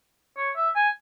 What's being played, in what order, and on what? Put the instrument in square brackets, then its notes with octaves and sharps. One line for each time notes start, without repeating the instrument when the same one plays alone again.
[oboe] C#5
E5
G#5